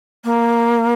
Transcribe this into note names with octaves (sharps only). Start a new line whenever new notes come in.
A#3